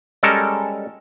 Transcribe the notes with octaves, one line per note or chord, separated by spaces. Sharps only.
G3 G#3 C#4 A4 A#4